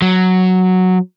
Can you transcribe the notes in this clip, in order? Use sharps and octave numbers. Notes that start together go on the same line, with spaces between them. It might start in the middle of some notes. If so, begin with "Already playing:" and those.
F#3